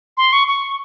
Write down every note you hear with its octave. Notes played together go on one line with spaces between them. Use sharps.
C6
C#6
C#6